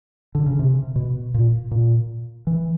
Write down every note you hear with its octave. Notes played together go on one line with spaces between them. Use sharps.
D3
C#3
C3
B2
A#2
A#2
E3